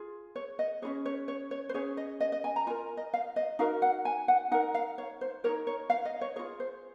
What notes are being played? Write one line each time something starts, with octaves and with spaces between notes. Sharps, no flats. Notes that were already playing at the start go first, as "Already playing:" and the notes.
Already playing: F4 G#4
C#5
D#5
C#4 F4 G#4 C#5
C#5
C#5
C#5
C5
C#4 G#4 C#5
D#5
D#5
D#5
G#5
A#5
F4 A#4 G#5
D#5
F5
D#5
D#4 F#4 A#4 F5
F#5
G#5
F#5
D#4 A#4 F#5
F5
C#5
C5
D#4 F#4 A#4 C#5
C#5
F5
D#5
C#5
F4 G#4 C#5
C5